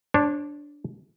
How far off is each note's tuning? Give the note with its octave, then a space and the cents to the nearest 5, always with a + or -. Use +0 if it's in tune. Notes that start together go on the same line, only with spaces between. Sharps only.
D4 -5 C#5 -45